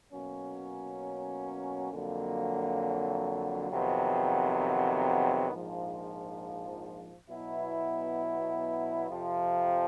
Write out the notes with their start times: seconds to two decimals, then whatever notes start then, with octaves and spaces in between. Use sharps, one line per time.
0.12 B2 F#3 A#3 C#4
1.91 F2 D3 F#3 A#3
3.70 F2 C3 D#3 F#3 B3
5.50 A#1 G#2 F3
7.30 B2 F#3 B3 E4
9.09 F2 C3 F3